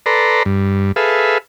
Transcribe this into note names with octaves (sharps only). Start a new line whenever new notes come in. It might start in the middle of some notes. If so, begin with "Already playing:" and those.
A4 B4 D5 A#5 C6
G2
G#4 A4 B4 E5 F5